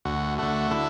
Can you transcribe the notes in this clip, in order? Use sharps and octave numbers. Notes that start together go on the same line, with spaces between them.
D2 F#4
D3 A3 F#4
D3 E4 A4